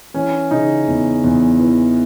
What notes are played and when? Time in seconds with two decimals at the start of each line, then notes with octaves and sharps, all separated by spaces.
0.14 E3 C#4
0.51 C#3 D#4
0.87 E2
1.24 E2
1.60 E3